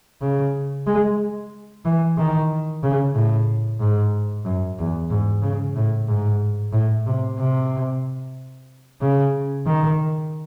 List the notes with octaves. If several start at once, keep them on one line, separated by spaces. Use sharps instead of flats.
C#3
G#3
E3
D#3
C#3
A2
G#2
F#2
E2
G#2
C#3
A2
G#2
A2
C3
C3
C#3
D#3